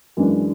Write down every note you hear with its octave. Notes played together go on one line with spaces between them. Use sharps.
F#2 E3 G#3 D4